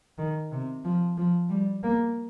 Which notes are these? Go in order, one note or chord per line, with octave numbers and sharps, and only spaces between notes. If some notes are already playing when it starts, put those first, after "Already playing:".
D#3
C3
F3
F3
G3
A#3